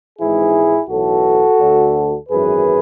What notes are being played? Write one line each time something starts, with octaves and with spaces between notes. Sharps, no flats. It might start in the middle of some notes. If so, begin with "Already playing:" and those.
G#1 G#2 E3 E4 G#4
B1 A2 E3 F#4 A4
D2 D3
G#1 F#2 E3 G#4 B4